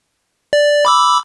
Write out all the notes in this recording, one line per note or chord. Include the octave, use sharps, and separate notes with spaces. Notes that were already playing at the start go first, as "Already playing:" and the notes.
D5
B5 D6 E6